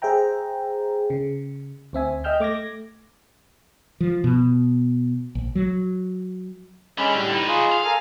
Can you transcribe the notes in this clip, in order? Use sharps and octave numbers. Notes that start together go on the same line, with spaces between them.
G#4 C5 E5 G5 A#5
C#3
D2 C4 E5 G#5
D#5 E5 G5 E6 F6 G6
A3 D6 G#6 A#6
F3
B2
A#1
F#3
D3 G#3 C#4 B5
A2 G3
D#4 B4
F4 G#4
F5
A4 A#4 G#5